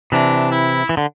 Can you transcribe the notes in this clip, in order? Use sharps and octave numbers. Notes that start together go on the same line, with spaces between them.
C3 E3 D4
E4
E3
D3